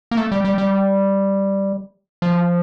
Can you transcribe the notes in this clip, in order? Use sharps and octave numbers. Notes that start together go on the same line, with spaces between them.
A#3
A3
G3
G3
G3
F3